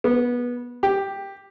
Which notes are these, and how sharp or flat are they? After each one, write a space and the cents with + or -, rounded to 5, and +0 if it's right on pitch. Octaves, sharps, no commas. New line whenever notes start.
B3 -20
G4 +5